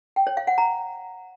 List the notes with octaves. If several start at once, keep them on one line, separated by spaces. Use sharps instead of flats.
G5
C#5
F5
F#5
A#5